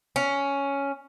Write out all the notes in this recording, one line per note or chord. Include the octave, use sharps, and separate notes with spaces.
C#4